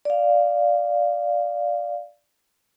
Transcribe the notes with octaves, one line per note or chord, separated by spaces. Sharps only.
D5 F5